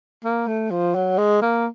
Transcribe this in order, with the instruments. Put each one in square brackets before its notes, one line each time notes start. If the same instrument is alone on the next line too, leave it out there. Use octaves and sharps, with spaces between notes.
[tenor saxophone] A#3
A3
F3
F#3
G#3
A#3